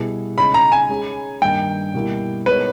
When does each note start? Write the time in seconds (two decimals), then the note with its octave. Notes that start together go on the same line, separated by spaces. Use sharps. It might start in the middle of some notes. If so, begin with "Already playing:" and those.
Already playing: B2 G3 B3 E4 G#4
0.37 C#3 G#3 D#4 G#4 C#5 B5
0.54 A#5
0.72 G#5
0.89 G#3 C#4 G#4
1.42 G2 D#3 A#3 D#4 G5
1.94 B2 G3 A#3 E4
2.46 G#3 B3 D#4 A#4 B4 C#5